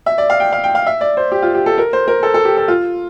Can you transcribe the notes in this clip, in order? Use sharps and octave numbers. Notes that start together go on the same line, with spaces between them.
E5
D5
F5
G5
F5
G5
F5
E5
D5
C5
G4
F4
G4
A4
A#4
C5
A#4
A4
A4
G4
A4
F4